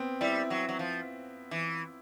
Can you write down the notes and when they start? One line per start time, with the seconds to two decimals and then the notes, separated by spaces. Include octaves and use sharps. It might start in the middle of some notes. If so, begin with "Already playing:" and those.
Already playing: B3 C4
0.21 G3 E4
0.50 F#3
0.69 F#3
0.79 F3
1.51 E3